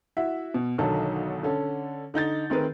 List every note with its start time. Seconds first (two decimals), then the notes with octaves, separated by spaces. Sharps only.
0.17 E4 F#4 E5
0.54 B2
0.78 B1 D3 D#3 F#3 A4
1.43 D3 C#4 A4
2.14 D3 D#4 G6 A6
2.50 D#3 A3 C4 G#4 A#4 B4